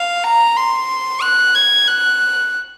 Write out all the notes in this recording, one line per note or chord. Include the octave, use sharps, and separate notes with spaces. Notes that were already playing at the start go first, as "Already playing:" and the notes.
Already playing: F5
A#5
C6
F#6
G#6
F#6